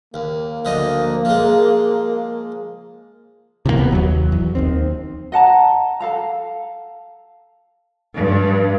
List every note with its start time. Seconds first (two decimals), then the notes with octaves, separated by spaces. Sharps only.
0.14 D#2 A#3
0.65 D2 F3 D#5
1.25 F3 G#3
3.66 C3 E3 F3 A#3
3.77 D#1 C2 C3 B3
3.92 D#2 F#3
4.32 E2
4.55 D#2 D#3 C4
5.32 D#5 F#5 A5 A#5
6.00 A4 F5 A#5
8.15 G2